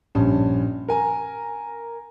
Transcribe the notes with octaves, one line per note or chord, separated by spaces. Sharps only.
A#1 G2 C#4
A#4 G#5 A#5